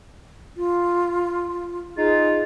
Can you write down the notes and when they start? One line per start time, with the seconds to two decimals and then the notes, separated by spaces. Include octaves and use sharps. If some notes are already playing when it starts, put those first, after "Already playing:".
0.57 F4
1.97 D#4 F4 G#4